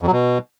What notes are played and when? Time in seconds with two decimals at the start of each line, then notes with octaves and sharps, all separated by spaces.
0.02 F2
0.07 F#3
0.12 B2